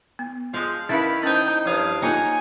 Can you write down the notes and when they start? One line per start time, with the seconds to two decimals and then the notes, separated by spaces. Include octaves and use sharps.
0.19 B3
0.54 F3 G#3 F5
0.89 D#3 C#4 E4 B4 E5 F5
1.23 C#4 D#4 C5 G5
1.66 G2 F3 C5 F5 D#6
2.02 A#3 D#4 F4 A4 C#5 F#5 G#5